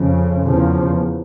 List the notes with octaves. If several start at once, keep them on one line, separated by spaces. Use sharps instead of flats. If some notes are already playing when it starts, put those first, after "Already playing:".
Already playing: F2 C#3
E2 C#3 F3